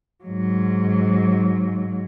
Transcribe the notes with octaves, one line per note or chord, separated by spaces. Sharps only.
G#2 F#3